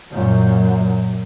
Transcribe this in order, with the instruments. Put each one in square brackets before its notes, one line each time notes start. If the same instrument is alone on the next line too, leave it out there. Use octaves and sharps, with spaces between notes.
[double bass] F#2 A#2